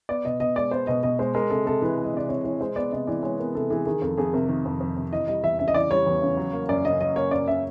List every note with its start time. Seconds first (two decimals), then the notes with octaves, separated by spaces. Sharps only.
0.09 B3 D5
0.25 B2 D#5
0.40 B2 D#5
0.56 G#3 D5
0.71 B3 C5
0.87 B2 D#5
1.03 B2 D#5
1.19 G#3 C5
1.35 G#3 A#4
1.50 C3 A4
1.66 C3 A4
1.82 E3 B4
1.98 G#3
2.04 D#5
2.13 C3 D5
2.29 C3 C#5
2.44 E3 C#5
2.61 G#3 C5
2.76 B3 D5
2.92 C3 D#5
3.07 E3 D5
3.23 G#3 C#5
3.39 B3 A#4
3.55 C3 A4
3.70 E3 G#4
3.86 D#3 G#4
4.01 F2 A4
4.18 F2 G#4
4.33 C3 A#4
4.49 D#3
4.65 F2
4.80 F2
4.97 C3
5.12 E3 D#5
5.27 G3 D#5
5.44 E2 E5
5.59 C#3 E5
5.68 D#5
5.74 E3 D5
5.91 G3 C#5
6.06 E2
6.22 C#3
6.37 F#3
6.53 A#3
6.69 F#2 D5
6.85 C#3 D#5
7.00 F#3 D#5
7.16 A#3 C#5
7.31 F#2 D5
7.47 C#3 E5